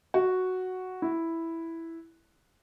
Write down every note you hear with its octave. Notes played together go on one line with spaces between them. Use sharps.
F#4
E4